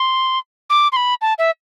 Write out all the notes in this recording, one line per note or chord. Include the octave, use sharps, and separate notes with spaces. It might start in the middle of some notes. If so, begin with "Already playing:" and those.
Already playing: C6
D6
C6
B5
A5
E5